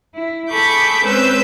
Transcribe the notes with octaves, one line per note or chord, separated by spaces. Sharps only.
E4
G#4 A4 B5 C#6 D6 G6
G#3 C4 C#4 B4 E6 G6